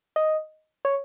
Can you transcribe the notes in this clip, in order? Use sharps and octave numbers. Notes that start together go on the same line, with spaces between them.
D#5
C#5